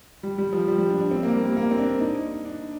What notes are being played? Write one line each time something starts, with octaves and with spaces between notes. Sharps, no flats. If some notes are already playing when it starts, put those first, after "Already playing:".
G3
G3
F3
G3
G3
D4
D4
C4
A#3
G3
A#3
A#3
C4
D4
D#4
D4